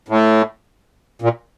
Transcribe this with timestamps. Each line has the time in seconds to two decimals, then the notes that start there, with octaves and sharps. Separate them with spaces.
0.09 A2
1.22 A#2